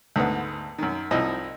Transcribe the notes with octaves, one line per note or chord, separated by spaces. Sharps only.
D2 G#2 D3 B3
F#2 D#3
C2 F3 D#4 E4 D#5